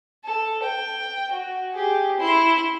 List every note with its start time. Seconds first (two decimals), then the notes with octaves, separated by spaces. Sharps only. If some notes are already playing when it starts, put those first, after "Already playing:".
0.24 A4
0.63 G5
1.32 F#4
1.73 G4 G#4
2.20 E4 C6